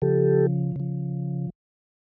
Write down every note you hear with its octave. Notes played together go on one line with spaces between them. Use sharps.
C#3 F3 G4 A4
C#3 F3